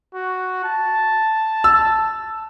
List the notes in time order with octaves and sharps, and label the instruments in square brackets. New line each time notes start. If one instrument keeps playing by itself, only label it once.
[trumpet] F#4
A5
[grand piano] E6